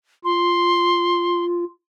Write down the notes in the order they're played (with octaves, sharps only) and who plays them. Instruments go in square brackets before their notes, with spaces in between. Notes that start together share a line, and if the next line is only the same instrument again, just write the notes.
[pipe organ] F4 [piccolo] C6